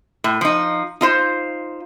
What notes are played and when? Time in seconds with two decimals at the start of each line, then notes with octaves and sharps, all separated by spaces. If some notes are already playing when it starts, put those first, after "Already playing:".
0.24 A2
0.41 F3 D#4
1.01 D#4 F4 C5